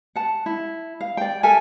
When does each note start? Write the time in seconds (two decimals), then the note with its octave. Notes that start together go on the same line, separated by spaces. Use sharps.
0.16 F#5 A5
0.46 E4
1.01 F5
1.17 D5 G5
1.43 A4 A#4 E5 G#5